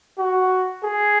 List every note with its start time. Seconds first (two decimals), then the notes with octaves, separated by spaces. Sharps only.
0.18 F#4
0.84 G#4